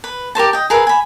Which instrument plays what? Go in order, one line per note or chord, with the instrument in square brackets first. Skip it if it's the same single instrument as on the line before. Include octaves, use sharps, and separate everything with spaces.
[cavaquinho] B4
G4 A#4 C5 A5
D#5 G5
G#4 A#4 B4 E5
G#5 B5